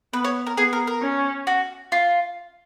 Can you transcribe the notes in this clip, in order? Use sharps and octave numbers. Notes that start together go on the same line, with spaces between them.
B3 B4
C#5
A#4
B3 G#4
A#4
A#4
C#4
F#4
F4